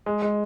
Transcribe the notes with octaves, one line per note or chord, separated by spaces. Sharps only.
G#3
G#3